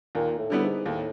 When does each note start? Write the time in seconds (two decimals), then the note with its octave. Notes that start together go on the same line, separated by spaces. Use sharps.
0.15 D#2 A#2
0.38 A2
0.50 D3 G3 B3 E4
0.63 G#2
0.85 D#2 A2